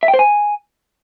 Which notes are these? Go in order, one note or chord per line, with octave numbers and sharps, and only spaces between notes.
E5
G5
C5
G#5